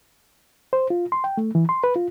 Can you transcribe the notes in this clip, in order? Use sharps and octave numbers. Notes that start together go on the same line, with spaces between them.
C5
F4
C6
G5
A3
E3
C6
B4
F4